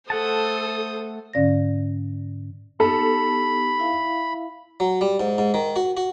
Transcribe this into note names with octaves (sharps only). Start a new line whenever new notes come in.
A3 A4 C5 F#5 A5 D#6
G#2 D3 C#4 D5 F5 A#6
B3 D#4 G4 A4 B5
E4 E5 F5
F#3
G3
G#2
G#2
D#3
F#4
F#4